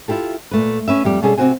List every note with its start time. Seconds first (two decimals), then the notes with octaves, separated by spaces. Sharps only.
0.08 E4 F4 G4 A4
0.51 A#2 A3 B4
0.88 C#4 B4 E5
1.05 F2 G3 G4
1.22 B2 G3 C#4 G#4 A4
1.38 C3 C4 D4 F#4 C5 G#5